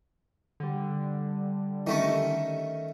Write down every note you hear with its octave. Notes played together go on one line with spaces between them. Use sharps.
D3 G3
D#3 A3 C#4